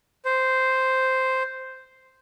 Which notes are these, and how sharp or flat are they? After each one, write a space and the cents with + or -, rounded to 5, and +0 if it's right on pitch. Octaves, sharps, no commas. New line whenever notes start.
C5 -5